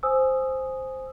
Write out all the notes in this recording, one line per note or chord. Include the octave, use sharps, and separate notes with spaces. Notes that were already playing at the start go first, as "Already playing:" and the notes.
C5 G#5 D#6 E6